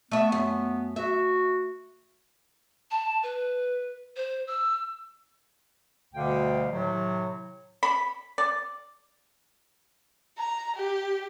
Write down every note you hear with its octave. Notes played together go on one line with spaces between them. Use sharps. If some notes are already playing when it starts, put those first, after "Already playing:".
A3 B3 E5
F#2 B3
F#4 E5
A5
B4
C5
E6
D2 B2 D3 G3 F5 G5
A2 C3 D#3 F#3
B5
D5
A#5
G4